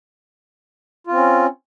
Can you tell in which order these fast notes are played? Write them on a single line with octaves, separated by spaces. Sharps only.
F4 C4 C#4